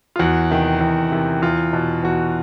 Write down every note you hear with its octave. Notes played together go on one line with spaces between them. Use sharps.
F4
E2 F#4
C3 D#3
E2
C3 D#3
E2 F4
B2
E2 F#4